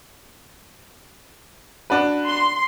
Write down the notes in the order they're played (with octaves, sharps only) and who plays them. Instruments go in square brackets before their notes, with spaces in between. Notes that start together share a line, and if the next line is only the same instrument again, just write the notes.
[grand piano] D4 F#4 B4
[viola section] C6